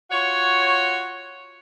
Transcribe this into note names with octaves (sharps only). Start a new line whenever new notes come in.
F4 F#4 C#5